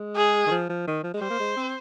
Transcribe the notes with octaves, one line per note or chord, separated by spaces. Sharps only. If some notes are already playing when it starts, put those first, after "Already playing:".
Already playing: G#3
G#4
D#3
F3
F3
D#3
F3
G#3
G3 C5
A#3
G#3
C4